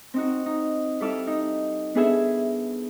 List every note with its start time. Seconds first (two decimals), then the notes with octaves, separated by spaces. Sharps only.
0.14 C4 D#4 F#4
0.46 D#4
1.00 G3 E4 A4 F5 D6 E6
1.27 D#4
1.95 B3 D4 E4 G#4 A4 E5